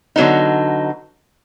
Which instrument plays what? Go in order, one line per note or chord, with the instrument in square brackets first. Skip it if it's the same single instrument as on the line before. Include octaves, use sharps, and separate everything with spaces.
[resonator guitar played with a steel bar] D3 F#3 B3 D#4